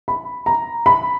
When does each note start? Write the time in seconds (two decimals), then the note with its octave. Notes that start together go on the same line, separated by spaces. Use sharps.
0.08 B5
0.46 A#5
0.86 B5